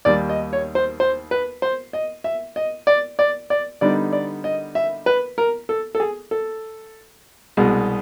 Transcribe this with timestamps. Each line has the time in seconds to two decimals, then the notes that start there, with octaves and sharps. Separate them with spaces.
0.05 D#2 D#3 G3 D5
0.29 D#5
0.53 C#5
0.75 C5
1.00 C5
1.31 B4
1.62 C5
1.93 D#5
2.24 E5
2.56 D#5
2.87 D5
3.19 D5
3.50 D5
3.81 D3 G3 B3 D#4 D5
4.12 D5
4.44 D#5
4.75 E5
5.06 B4
5.38 A#4
5.69 A4
5.95 A4
6.00 G#4
6.31 A4
7.57 C2 B2 G#3